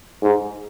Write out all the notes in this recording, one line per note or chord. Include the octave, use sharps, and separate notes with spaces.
G#2